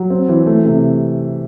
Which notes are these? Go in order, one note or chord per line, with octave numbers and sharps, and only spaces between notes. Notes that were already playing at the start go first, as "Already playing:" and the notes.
Already playing: F#3
C4
E3
A3
C3